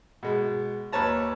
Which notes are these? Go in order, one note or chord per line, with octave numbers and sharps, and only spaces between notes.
B2 G#3
D#2 B4 C#5 A5 A#5